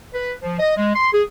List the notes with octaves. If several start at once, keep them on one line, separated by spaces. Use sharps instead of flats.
B4
F3
D#5
G#3
C6
G#4